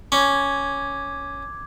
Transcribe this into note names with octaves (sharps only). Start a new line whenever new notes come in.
C#4 D6 G#6